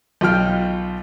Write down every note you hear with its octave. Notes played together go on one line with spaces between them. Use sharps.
B1 F4 G5 F6